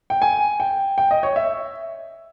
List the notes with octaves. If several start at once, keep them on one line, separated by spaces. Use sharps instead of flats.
G5
G#5
G5
G5
D#5
C#5
E5